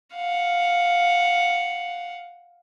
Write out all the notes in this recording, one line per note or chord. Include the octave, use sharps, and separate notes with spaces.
F5 F#5